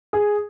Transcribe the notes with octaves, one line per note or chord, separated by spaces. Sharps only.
G#4